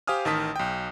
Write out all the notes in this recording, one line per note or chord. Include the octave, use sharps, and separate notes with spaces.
G4 C5 F5 G#5 D#6 F6
A1 D#3 A5 D#6 B6
B1 G5